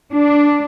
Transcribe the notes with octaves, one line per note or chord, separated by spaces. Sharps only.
D4